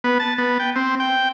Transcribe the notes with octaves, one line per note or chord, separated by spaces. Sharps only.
B3
A5
B3
G5
C4
G5